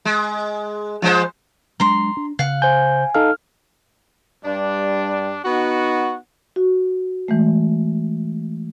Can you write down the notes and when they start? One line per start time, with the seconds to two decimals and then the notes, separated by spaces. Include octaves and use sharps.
0.05 G#3
1.02 F3 G#3 C5
1.80 F#3 G#3 D4 A#5 C6
2.17 D4
2.39 C#3 F5 F#5
2.62 C5 G#5 G6
3.15 D#4 A4 F5 F6
4.44 G2 G3 D4
5.44 B3 D#4 F#4
6.56 F#4
7.28 E3 G#3 A3